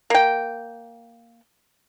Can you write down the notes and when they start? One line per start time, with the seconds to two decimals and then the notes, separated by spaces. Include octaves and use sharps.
0.10 A#3 G5